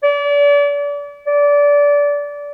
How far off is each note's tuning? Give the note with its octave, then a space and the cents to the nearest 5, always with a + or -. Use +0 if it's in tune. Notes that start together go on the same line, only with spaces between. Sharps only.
D5 -35
D5 -25